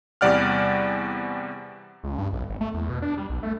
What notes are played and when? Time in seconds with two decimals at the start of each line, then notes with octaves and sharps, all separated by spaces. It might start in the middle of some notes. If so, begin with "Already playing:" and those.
0.21 E2 C3 G3 D5 F#5 F6
2.04 C#2
2.18 G2
2.33 B1
2.49 G#1
2.61 A3
2.74 E2
2.90 B2
3.02 D4
3.17 G3
3.30 B1
3.43 A3